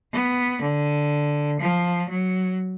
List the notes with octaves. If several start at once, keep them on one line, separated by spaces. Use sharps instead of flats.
B3
D3
F3
F#3